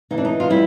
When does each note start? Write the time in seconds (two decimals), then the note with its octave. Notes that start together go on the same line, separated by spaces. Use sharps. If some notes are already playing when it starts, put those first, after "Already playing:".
0.11 E3 D#4
0.18 D4
0.25 D#4
0.40 F4
0.50 G3 E4